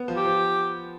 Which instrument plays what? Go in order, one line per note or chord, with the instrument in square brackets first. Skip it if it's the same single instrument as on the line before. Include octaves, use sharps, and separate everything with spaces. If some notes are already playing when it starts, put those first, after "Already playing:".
Already playing: [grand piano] B3
F3
[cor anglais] G4
[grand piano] F3